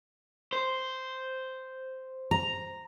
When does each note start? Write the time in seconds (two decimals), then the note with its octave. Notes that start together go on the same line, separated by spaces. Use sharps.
0.53 C5
2.31 A#5